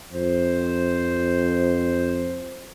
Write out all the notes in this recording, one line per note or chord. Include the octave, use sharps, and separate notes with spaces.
F2 C5